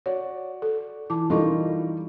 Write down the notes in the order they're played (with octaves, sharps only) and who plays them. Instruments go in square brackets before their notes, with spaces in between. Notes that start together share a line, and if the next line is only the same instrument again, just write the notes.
[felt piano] F#4 D5 [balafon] C#5
[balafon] A4
[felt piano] E3 [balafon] A5 D6
[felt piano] E3 G3 A#4 [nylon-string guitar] D#4 F4 [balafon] A4 D#5 C#6